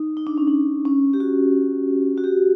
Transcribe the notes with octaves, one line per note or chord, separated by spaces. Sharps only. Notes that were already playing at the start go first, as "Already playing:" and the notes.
Already playing: D#4
D#4
D4
C#4
D4
C#4
G4
F#4
F#4
G4